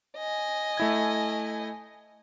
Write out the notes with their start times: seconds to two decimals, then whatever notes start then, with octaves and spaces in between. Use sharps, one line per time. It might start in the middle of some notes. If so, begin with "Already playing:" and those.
0.18 D#5 G#5
0.77 A3 E4 G#6